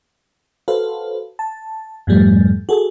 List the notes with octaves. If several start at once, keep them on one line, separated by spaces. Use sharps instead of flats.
F#4 A4 B4 C5 F5
A5
F2 G#2 F3 G3 A3
F#4 G#4 A4